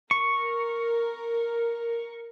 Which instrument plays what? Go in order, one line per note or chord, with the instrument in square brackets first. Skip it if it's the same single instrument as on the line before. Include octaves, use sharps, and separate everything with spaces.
[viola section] A#4 [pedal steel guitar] C#6